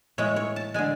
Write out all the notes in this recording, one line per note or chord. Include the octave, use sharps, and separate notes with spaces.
A2 G#3 C#5
C#5
A5
D3 G#3 G#5